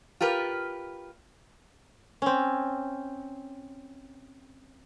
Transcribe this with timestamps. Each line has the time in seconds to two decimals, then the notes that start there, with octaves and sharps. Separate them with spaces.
0.21 F4 G4 A#4 B4
2.22 C4 C#4